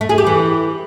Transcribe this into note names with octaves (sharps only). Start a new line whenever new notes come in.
A3
G#4
G4
E3